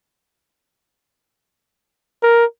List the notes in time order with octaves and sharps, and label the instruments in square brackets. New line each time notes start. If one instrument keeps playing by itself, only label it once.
[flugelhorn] A#4